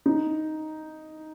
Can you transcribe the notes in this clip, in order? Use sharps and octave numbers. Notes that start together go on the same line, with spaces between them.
D#4